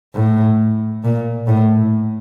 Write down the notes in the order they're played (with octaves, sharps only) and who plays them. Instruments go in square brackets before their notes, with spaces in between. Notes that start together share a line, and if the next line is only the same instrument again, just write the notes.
[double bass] A2
A#2
A2